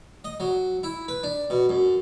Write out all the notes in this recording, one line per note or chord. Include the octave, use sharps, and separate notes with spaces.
D#5
F#3
E4
B4
D4
B2
F#2